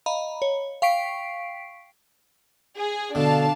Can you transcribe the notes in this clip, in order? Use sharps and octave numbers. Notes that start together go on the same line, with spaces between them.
D#5 F5 A#5 B5
C#5
F5 G5 C#6 B6 C7 D7
G#4
B2 D3 D4 F5 A5